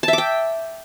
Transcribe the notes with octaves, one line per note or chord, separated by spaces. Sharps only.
E5 G5 A5 D6